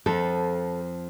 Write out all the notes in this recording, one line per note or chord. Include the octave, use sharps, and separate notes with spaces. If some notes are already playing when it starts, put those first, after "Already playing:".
F2 F3 A4